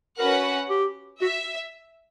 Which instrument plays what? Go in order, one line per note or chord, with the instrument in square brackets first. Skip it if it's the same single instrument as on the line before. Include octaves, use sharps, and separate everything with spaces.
[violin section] C#4 F#4 B4 F#5 [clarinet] A#4
[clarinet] G4
[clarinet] F#4 [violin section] E5